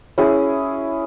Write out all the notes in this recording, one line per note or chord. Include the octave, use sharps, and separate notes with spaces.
C#4 E4 G#4